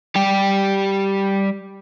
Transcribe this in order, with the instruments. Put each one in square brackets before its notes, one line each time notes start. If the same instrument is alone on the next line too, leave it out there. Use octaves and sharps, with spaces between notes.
[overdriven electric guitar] G3 G4